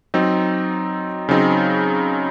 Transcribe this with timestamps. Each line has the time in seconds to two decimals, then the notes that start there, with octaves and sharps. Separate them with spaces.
0.14 F#3 C4 D#4
1.29 C#3 F#3 C4 D#4